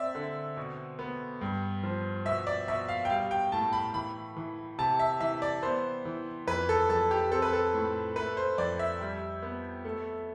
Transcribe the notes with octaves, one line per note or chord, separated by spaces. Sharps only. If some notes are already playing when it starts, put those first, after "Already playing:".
Already playing: C4 D5 E5
D3
B2
B3
G2
F3
B2 E5
D5
B2 E5
F5
G5
G3 F5
G5
A2 A5
B5
E3 B5
E3
C3 A5
E5
E3 E5
D5
B3 C5
E3
F2 B4
A4
F2 A4
G4
C4 A4
B4
A4
A2
A3 B4
C5
F2 D5
E5
G3
B3
A3